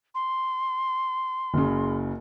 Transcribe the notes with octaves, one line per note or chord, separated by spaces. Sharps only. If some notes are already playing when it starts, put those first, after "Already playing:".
C6
F#1 C#3